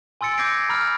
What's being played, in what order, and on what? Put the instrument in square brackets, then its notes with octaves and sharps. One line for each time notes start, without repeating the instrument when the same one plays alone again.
[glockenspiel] G#5 C6 E6 A6 C#7 D7
D6 G6 G#6 A#6 C7 D7
A#5 B5 F6